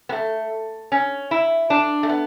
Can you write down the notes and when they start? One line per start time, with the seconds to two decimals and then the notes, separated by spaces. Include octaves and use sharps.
0.09 B3
0.12 A3
0.92 C#4
1.31 E4
1.70 D4
2.03 A3
2.09 B3